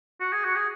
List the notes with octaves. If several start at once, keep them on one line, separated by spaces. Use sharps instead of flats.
F#4
G#4
F#4
G#4